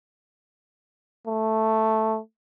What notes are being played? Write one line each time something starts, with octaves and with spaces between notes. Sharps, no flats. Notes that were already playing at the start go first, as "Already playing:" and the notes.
A3